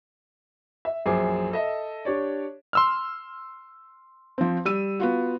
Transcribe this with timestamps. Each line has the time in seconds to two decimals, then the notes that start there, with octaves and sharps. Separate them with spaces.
0.85 E5
1.06 A#1 F#2 G#4 C5 G#5 D6
1.52 A4 D#5 E5
2.05 D4 G4 C#5 D5
2.73 C6 E6 F6
4.38 F3 C4
4.65 G3 E6 D#7
5.00 B3 F4 F#4